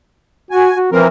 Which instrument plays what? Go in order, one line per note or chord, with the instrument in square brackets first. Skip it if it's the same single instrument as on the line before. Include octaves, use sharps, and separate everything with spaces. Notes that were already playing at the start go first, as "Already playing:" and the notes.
[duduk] F#4 [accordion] G#5
[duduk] F#4
[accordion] E3 C4 A#4 [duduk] F3